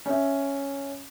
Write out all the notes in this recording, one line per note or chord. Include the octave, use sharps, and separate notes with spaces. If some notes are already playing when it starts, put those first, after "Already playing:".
C#4 E5